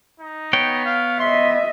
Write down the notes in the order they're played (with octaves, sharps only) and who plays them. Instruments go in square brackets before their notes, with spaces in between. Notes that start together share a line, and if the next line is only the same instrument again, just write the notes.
[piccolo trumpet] D#4
[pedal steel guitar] B3 C#5 G5
[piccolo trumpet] F5
[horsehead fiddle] D#5 E5 [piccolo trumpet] C6